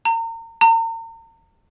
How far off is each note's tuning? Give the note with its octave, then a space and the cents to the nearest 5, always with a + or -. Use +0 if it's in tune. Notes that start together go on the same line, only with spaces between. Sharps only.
A#5 -35
A#5 -40